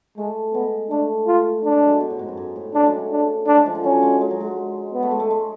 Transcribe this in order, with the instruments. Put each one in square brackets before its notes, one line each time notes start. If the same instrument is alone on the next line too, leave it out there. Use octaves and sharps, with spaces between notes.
[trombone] G#3 [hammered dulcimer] A3
[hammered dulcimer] G#3 [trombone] B3
[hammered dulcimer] A3 [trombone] D4
[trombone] F4
[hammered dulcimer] A3 [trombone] D4
[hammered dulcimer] G#3
F#3
G#3
B2
A2
G#2
F#2
G#2
A2
[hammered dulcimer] C#3 [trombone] D4
[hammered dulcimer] F#3 G#3
A3
[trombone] D4
[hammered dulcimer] A3 [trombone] D4
[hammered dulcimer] G#3
F3
D3
[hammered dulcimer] F#3 [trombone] C#4
[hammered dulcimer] G#3
G#3
F#3
G#3
[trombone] B3
[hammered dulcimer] A3
G#3
A3
G#3